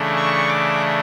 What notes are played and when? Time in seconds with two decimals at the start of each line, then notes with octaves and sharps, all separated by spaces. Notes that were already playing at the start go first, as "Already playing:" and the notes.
Already playing: C#3 E3 A3 D4
0.16 C#6
0.49 D6